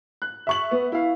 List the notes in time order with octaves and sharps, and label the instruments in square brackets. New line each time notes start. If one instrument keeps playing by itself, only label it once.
[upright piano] F#6
[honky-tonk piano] E5 C#6 F#7
[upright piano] B3
E4 F5